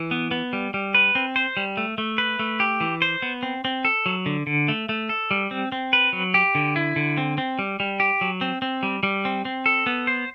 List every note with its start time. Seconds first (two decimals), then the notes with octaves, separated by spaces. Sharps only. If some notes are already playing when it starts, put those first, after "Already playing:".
Already playing: E3
0.11 B3
0.31 B3
0.53 G3
0.74 G3
0.94 B4
1.15 C4
1.36 C5
1.57 G3
1.77 A3
1.98 A3
2.18 B4
2.39 A3
2.60 G4
2.81 E3
3.02 C5
3.22 B3
3.43 C4
3.65 C4
3.85 A4
4.06 F#3
4.26 D3
4.47 D3
4.68 A3
4.89 A3
5.09 A4
5.31 G3
5.51 C4
5.72 C4
5.93 B4
6.13 F#3
6.34 G4
6.55 D3
6.76 E4
6.96 D3
7.17 C4
7.38 C4
7.59 G3
7.80 G3
8.00 G4
8.21 F#3
8.41 C4
8.62 C4
8.83 G3
9.03 G3
9.25 C4
9.45 C4
9.66 A4
9.86 B3
10.07 C5